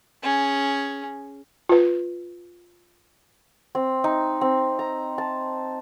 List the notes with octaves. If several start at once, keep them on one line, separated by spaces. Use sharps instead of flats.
C#4 G#4
F4 B4
C4
D#4
C4
A#5
A5